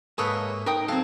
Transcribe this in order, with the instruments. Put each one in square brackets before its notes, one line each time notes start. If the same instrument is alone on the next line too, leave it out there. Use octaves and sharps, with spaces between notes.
[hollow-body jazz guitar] G#2 A#3 [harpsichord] G#4 A4 B4 [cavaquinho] C#5 D#5 E5
[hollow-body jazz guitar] D#4 [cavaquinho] A#4 G5 D#6
[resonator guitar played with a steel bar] F#3 C4 [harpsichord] A4 [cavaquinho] F5